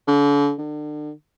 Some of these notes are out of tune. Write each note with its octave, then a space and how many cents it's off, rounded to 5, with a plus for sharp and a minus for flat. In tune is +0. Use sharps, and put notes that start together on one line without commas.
D3 -40
D3 +35